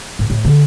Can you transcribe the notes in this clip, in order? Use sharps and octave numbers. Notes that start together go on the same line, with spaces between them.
G#2
A2
D3